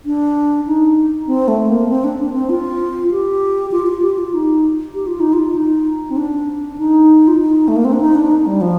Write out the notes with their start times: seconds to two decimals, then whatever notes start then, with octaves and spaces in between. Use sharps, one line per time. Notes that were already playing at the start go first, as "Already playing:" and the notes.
0.06 D4
0.67 D#4
1.27 C4
1.48 A3
1.69 A#3
1.89 C4
2.04 D4
2.19 D4
2.34 C4
2.49 F4
3.11 G4
3.72 F4
3.87 F4
4.02 G4
4.18 F4
4.34 D#4
4.94 G4
5.07 F4
5.20 D#4
5.33 F4
5.55 D#4
6.10 C4
6.17 D4
6.78 D#4
7.28 F4
7.39 D#4
7.68 A3
7.76 A#3
7.85 C4
7.93 D4
8.01 D#4
8.15 D4
8.31 D#4
8.46 G3
8.61 F3